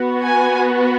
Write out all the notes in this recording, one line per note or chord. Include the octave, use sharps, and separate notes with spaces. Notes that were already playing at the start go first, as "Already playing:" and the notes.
Already playing: B3 F#4
G#5